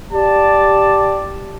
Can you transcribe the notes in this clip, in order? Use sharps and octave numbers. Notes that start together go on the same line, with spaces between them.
G4 D5 A5